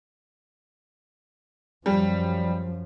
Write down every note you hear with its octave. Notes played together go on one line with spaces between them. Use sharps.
F#2 F3 G3